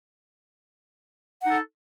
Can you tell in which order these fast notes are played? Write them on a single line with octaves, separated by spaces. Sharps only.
F#5 D#4 A4